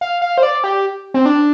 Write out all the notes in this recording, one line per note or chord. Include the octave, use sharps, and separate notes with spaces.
F5
F5
C5
D5
G4
C4
D4